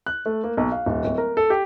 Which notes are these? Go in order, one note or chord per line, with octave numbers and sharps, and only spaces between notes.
F#6
A3
A#3
B1
F5
D#1
D1
A#4
A4
G4